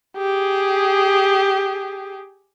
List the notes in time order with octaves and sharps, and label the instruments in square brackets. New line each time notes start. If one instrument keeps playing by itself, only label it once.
[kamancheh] G4 G#4